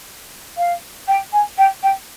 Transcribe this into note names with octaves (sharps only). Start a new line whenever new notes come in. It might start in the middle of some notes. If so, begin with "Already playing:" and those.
F5
G5
G#5
G5
G5